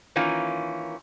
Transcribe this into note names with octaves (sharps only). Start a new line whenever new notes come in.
D#3 E3 A#3 C#4 F4